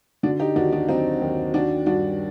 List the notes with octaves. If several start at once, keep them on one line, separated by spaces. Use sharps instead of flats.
D3 D4 F#4
D#4 G4
D#2 D4 F#4
D4 F#4
F#3 C4 D#4
D#2
D#3 D4 F#4
G2 D4 F#4